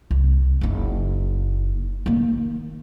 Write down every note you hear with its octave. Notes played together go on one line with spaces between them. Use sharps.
C2
F#1 D#4
D#3 A#3